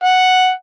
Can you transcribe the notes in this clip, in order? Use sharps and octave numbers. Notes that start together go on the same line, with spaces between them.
F#5